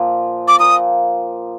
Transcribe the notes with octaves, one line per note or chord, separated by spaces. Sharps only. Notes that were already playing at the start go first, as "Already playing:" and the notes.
Already playing: A#2 F3 A#3
D6
A#2 F3 A#3 D#6